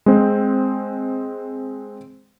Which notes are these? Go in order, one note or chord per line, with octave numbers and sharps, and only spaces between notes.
G#3 C4